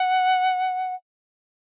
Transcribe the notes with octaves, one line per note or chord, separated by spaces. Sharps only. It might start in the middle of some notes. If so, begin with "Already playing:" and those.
Already playing: F#5